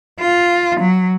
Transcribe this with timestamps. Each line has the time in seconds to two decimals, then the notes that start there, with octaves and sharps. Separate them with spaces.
0.19 F4
0.80 F#3